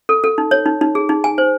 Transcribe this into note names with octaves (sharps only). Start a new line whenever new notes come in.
A4
A4
D#4
C#5
D#4
D#4
G#4
D#4
G#5
C5